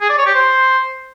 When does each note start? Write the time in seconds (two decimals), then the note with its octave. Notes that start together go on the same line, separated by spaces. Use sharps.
0.01 G#4
0.10 D5
0.18 C#5
0.26 G4
0.35 C5